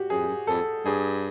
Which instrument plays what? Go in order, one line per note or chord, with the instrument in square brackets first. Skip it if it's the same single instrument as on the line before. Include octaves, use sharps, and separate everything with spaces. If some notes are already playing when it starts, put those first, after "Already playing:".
Already playing: [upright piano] F#4 G4
[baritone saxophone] F#2 [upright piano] G#4
[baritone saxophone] F2
F#2
[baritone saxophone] F2 [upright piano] A4
[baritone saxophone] G2 [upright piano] G#4